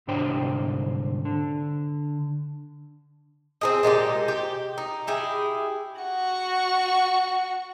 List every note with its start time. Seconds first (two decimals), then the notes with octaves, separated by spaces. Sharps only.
0.07 C2 G#2 D3 D4 C5 G5
1.25 D3
3.61 C4 G#4 D#5
3.83 A#2 G#3 D#4 G4
4.28 G4
4.78 D#4
5.07 E4 G4 G#4
6.01 F#4 C#6